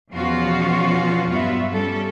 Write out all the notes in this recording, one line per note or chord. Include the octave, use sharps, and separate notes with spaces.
E2 B2 F3 C#4 F4 F#4
G2 F#3 B3 F4 F#4 E5
G3 C#4 A4